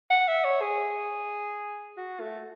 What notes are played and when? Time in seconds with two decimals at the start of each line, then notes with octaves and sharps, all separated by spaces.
0.10 F#5
0.28 E5
0.44 C#5
0.61 G#4
1.97 F#4
2.20 A3